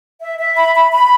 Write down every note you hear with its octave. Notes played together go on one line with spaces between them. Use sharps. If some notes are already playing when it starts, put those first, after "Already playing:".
E5
E5
B5
B5
B5